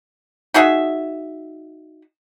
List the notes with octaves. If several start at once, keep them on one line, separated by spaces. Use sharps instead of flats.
D#4 F#4 G#4 E5